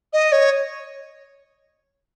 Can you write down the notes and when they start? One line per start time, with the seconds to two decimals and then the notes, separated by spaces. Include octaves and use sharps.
0.13 D#5
0.32 C#5